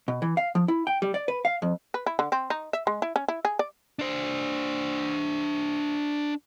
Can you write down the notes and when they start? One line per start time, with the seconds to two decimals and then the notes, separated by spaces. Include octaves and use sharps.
0.08 B2
0.22 E3
0.37 F5
0.55 F3
0.68 E4
0.87 G5
1.02 G3
1.14 D5
1.28 B4
1.45 F5
1.62 F2
1.94 B4
2.06 E4
2.19 D3
2.32 C4
2.50 D#4
2.73 E5
2.87 G#3
3.02 E4
3.16 C#4
3.28 E4
3.45 G#4
3.59 D5
3.99 D4 C5